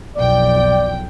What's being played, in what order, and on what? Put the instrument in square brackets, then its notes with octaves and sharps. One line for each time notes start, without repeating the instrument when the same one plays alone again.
[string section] B1 F2 G5 [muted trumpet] D5